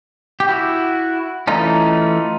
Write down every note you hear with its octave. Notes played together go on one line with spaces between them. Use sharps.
G4
E4 F#4
E3 A3 C#4 D#4 F4